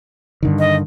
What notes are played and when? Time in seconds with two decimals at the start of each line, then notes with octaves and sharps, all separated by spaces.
0.43 G2 D3 D#3
0.59 D#5